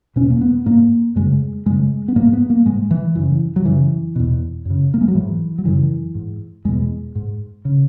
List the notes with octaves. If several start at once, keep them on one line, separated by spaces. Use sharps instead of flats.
E2 B2 C#4
A#3
B3
G#2 A#3
F#2 C#3 G#3
F#2 C#3 G#3
B3
G#2 A#3
B3
A#3
G#2 G#3
E3
F#2 C#3 E3
F#3
F#2 C#3 E3
E2 B2
F#2 C#3
A#3
G#3
F#3
G#2 E3
F#3
F#2 C#3 E3
G#2
E2 B2 G#3
G#2
C#3